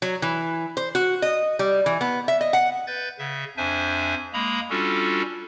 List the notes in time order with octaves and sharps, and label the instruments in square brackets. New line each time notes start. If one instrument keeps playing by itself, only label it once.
[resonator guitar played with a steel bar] F#3
E3
C5
F#4
D#5
G3
E3
B3
E5
D#5
F#5
[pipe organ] B4 G6 A6
C#3 E5
F2 D4 C5 E5 G#5
G#3 A#3 A#5 B5 D#6
G3 C#4 D4 F4 F#4 A4